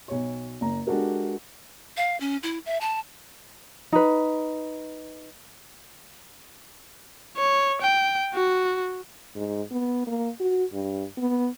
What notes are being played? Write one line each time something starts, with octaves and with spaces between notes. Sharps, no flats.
B1 C#5
F#1 A#5
G#3 D4 F#4 G4 A4 A#4
F5
C#4
E4
E5
A5
D#4 B4
C#5
G5
F#4
G#2
B3
A#3
F#4
G2
B3